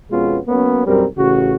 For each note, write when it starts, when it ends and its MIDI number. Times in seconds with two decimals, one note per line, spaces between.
0.11 0.38 41
0.11 0.38 47
0.11 0.38 56
0.11 0.38 59
0.11 0.38 61
0.11 0.38 65
0.48 0.83 54
0.48 0.83 58
0.48 0.83 59
0.48 0.83 61
0.87 1.05 35
0.87 1.05 42
0.87 1.05 55
0.87 1.05 60
0.87 1.05 70
1.17 1.56 33
1.17 1.56 49
1.17 1.56 66